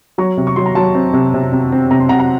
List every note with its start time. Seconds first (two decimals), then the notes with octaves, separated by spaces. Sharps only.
0.18 F#3 A#5 C#6
0.37 C3
0.47 C#6
0.56 F#3 C6
0.66 A#5
0.75 F#3 A5 C6
0.95 C4
1.14 C3
1.34 C3
1.53 C3
1.72 C4
1.91 C3 A#5
2.00 C6
2.09 C3 F#5 A#5
2.19 F#5 A#5